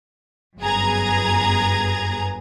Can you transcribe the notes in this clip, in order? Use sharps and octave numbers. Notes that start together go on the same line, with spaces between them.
G1 F#2 B3 G#4 A#5 G#6